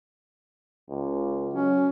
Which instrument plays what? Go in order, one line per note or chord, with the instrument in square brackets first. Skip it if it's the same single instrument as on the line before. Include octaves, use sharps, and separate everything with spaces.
[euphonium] C#2
[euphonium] F#3 [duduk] C#4